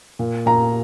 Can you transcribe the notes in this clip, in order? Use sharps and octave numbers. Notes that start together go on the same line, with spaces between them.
A#2
A#2 A#5